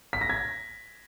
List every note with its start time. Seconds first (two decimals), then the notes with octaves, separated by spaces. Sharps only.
0.13 B6
0.21 A#6
0.30 G#6